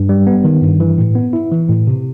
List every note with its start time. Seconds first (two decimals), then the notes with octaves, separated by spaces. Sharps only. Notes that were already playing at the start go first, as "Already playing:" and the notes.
Already playing: G2
0.09 G3
0.27 B3
0.44 D#3
0.62 G2
0.80 E3
0.98 A2
1.15 B3
1.33 E4
1.52 E3
1.69 A2
1.87 C3